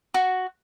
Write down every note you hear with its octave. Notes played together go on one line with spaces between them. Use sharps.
F#4